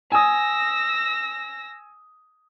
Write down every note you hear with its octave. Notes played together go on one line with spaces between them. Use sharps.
G#5 D#6 E6 A#6